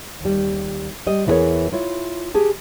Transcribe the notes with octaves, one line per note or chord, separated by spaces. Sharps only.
D#2 G3
G3 D#5
E2 E3 D4 G#4 A#4 C#5
E4 F4 C#5
G4 G#4 A5